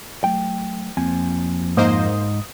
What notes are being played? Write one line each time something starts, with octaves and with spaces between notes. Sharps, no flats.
F#3 A3 G5
F2 F3 A#3 C4 G#5
G#2 A#3 D#4 C5 D#5 D#6